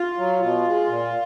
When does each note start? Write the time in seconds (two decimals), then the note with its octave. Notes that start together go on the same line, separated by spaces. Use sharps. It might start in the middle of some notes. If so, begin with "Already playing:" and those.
Already playing: F4
0.17 F#3
0.40 B2 F4
0.64 G#3
0.87 A#2